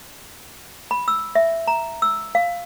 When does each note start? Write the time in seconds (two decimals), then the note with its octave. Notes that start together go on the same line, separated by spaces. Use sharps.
0.91 B5
1.08 E6
1.35 E5
1.67 A#5
2.02 E6
2.35 F5